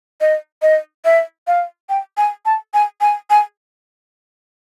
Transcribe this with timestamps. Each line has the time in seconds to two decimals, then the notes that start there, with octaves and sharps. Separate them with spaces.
0.21 D#5
0.62 D#5
1.05 E5
1.47 F5
1.89 G5
2.17 G#5
2.46 A5
2.74 G#5
3.01 G#5
3.30 G#5